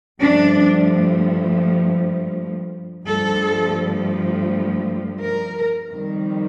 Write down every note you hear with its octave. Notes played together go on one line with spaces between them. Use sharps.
G2 F3 A3 D4
G2 F3 A3 A4
A#4
F2 D#3 G3